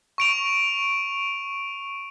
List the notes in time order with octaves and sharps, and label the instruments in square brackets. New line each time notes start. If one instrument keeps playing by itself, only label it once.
[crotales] C#6 D7 F7